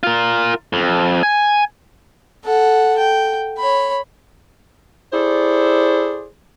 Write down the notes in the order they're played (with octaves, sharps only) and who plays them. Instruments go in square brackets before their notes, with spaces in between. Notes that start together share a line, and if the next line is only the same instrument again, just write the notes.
[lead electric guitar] F4 A#4
F2
G#5
[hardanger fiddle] A4 F#5
G5
C#5 B5
[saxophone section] E4 G#4 A4 C5 D5